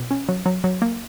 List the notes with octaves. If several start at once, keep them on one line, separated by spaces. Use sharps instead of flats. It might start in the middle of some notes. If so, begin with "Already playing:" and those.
Already playing: B2
C#4
F#3
F#3
F#3
A#3